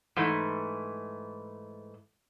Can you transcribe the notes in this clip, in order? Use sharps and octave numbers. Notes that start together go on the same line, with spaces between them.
G#2 E3 A3